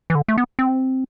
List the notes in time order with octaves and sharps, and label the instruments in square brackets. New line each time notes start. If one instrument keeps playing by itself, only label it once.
[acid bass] E3
D3
A3
B3
C4